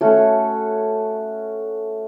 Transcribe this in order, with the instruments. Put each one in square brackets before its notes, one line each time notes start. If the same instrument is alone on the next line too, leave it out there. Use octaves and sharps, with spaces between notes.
[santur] A3 C#4 F#4